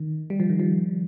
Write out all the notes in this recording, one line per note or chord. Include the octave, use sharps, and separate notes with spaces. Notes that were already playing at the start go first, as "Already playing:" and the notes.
Already playing: D#3
G3
F3
D#3
F3